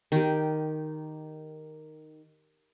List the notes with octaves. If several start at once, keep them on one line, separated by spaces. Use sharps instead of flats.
D#3 G4